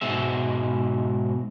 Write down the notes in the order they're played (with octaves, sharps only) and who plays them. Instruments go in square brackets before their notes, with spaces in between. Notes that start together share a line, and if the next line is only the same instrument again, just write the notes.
[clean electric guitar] G#2 B2 G#3 E5